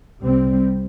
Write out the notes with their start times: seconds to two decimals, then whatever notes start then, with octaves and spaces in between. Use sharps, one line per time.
0.21 C2 C3 G3 C4